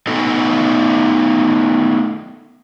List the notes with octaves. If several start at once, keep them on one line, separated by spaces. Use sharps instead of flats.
A3 B3 D#4 A4 D#5